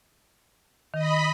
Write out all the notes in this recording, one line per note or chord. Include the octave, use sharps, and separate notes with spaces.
D#3 D#5 B5